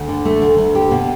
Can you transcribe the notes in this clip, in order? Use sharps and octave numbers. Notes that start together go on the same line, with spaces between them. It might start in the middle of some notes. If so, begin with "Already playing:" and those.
Already playing: D2
D3
A3
D2
D2
G4
B2